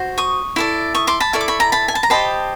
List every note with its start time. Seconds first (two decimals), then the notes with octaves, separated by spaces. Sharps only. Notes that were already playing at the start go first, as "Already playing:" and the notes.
Already playing: F#4 C5
0.18 C#6 D#6
0.56 E4 A4 D5
0.95 C#6 D#6
1.07 C6 D6
1.20 A5 B5
1.33 E4 A4 D5 C#6
1.41 D6
1.48 B5 C#6
1.60 A#5
1.72 A5 B5
1.88 G#5
1.95 A5
2.03 A#5
2.10 G4 C5 D#5 A5 B5